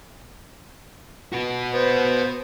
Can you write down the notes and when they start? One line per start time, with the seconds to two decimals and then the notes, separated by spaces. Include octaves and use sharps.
1.33 F#4 B4
1.74 B3 C5